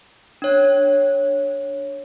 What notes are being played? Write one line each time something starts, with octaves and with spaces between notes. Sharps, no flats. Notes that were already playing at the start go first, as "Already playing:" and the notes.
D4 C#5 G#6